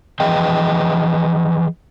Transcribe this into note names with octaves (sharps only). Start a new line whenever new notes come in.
E3 F3 G#4 B4 D#5 G5